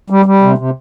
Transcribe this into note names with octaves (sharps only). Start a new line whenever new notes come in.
G3
G3
C3
C3